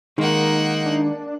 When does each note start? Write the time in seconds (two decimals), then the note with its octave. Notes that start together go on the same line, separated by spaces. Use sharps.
0.18 D#3 G#3 A#3 D#4 F#5
0.86 D4